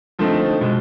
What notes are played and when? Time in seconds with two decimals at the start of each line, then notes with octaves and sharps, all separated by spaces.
0.19 D3 F3 A3 C4 D#4
0.61 B2 G#3